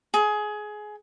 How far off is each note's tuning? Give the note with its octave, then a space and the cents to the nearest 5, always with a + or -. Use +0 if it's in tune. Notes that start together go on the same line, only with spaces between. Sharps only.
G#4 +20